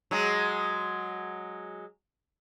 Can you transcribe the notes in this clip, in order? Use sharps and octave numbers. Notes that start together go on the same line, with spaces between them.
F#3 G#3